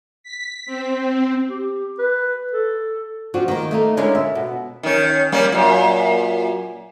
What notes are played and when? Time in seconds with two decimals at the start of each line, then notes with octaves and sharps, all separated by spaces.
0.23 B6
0.66 C4
1.00 C4
1.50 G4
1.99 B4
2.53 A4
3.34 F3 C4 D4 F4 F#4
3.48 D#3 A#3
3.71 A3 A#3 D#4
3.97 D3 G#3 C#4 D4 E4 A#4
4.15 E5
4.35 B2
4.83 D#3 C#4
5.32 G3 A#3 C#4
5.52 F#2 A#2